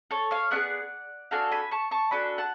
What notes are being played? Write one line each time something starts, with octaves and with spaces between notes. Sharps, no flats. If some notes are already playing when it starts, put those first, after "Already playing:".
A4 C#5
C#5 F5
B3 D4 G#4 D5 F#5
D4 F#4 A4 F5 G#5
G#5 B5
A5 C#6
A5 C#6
D4 F#4 A4 G#5 B5
F#5 A5